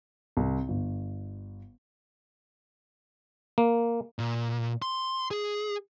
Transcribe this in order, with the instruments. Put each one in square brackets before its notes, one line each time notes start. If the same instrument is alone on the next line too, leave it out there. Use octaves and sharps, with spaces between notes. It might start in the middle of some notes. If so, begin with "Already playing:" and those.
[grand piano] C2
G1
[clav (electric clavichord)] A#3
[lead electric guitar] A#2
C6
G#4